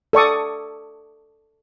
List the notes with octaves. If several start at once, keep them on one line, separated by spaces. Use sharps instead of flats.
A4 D5 C#6 D#6